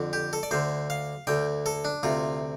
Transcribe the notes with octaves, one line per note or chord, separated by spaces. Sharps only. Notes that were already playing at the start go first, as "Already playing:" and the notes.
Already playing: F2 D3
G4
A4
D5
D2 D3 C5
F5
D2 D3 G5
A4
D4
D2 C3 F4